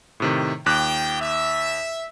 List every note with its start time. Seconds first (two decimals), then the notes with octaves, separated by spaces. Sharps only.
0.20 A2 C3 D#3
0.66 D#2 F4 G5 D6 F#6
1.20 E5